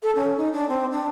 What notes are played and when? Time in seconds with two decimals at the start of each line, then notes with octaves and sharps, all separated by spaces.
0.03 A4
0.15 C#4
0.37 D#4
0.53 D4
0.69 C4
0.91 D4